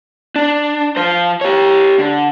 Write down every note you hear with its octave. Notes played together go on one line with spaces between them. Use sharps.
D4
F3 C5
G4 C#5
D3